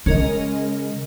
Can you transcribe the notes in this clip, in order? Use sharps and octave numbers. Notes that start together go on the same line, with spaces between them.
C#3 G#3 C#4 A#4 D#5